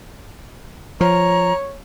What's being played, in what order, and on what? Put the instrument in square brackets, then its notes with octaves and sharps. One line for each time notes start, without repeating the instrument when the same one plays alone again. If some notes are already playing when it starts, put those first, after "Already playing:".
[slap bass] F3 [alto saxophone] C#5 [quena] A#5